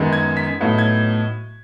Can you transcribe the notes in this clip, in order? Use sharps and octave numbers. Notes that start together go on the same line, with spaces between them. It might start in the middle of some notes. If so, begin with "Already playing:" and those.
Already playing: F#2 D#3 G#3 B3
G#6
B6
A2 F#3 B3 D#4
G#6